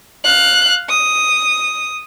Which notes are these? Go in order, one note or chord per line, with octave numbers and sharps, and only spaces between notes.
F5 F#6
D#6